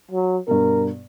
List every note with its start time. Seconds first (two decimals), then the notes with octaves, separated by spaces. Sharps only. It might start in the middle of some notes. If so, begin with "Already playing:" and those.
0.11 F#3
0.48 G2 B2 A#4